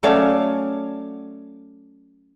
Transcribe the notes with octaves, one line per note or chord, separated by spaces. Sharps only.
F#3 A3 C#4 C#5 D5 F5